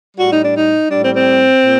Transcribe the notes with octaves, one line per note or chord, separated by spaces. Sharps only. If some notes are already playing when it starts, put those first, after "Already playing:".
A2 G3 F#4
D#4
D4
D#4
A2 G3 D4
C4
C4
A#2